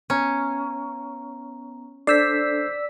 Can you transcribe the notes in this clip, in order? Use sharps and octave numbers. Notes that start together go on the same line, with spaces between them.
B3 C#4 A#5
D4 A4 C5 D5 E6 G6 B6 C7